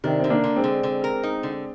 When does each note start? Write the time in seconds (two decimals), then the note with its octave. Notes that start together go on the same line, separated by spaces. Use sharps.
0.04 C3 D#3 D4
0.20 D3 C4
0.30 A#3 D4
0.44 D3
0.56 G#3 C4
0.64 D3
0.83 D3
1.04 A#4
1.23 D#4
1.43 D3